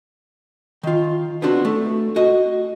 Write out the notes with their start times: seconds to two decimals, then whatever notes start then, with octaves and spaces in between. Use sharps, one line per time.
0.83 D#3 F4
1.42 B3 C4 D4 F#4
1.65 A3
2.16 F#4 D#5